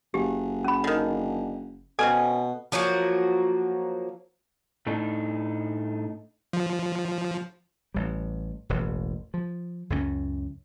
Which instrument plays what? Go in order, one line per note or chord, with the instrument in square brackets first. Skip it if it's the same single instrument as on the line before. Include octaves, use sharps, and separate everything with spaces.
[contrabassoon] F#1 [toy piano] G4
[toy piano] C#4 B5
[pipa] D3 D#3
[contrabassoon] B2 [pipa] C4 C#4 G#5 [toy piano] A4
[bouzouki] F3 F#3 A#3 F#4
[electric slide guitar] A2 A3 D4 D#4
[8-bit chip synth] F3
[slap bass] A1 G3
E1 A1 E2
F3
C#2 F#2 F3 C#4